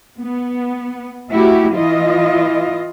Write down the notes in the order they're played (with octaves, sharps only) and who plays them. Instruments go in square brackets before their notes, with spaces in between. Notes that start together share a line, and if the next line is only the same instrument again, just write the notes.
[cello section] B3
A3 E4 F#4 G4
E3 E4 F4 D#5